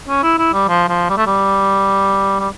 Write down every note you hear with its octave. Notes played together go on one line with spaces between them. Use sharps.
C#4
E4
E4
G3
F3
F3
G3
A3
G3
G3